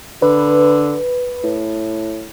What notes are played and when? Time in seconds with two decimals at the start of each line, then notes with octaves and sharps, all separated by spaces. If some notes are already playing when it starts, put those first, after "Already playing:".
0.22 D3 B4
1.44 A2